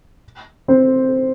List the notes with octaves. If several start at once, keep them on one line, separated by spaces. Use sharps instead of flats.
C4 C5